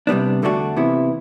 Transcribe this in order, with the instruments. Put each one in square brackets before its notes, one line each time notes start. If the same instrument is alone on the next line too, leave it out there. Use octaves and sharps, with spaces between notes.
[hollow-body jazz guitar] C2 C3 G3 B3 D4
E2 D3 A3 D4 F#4
C3 E3 B3 E4